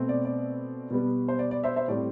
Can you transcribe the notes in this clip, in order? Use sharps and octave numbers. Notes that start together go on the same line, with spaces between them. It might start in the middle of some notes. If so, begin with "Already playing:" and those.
Already playing: B2 A3 C4
D5
D5
B2 G3 B3
C5
D5
D5
C5 E5
C5 E5
A2 G3 C4 D5